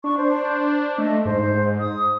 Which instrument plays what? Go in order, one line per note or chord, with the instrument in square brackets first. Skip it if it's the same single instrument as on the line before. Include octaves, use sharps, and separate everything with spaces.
[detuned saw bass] D4 [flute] C#6
[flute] C5
[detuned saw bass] A3 [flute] D#5
[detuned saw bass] G#2 [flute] C5
[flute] D#6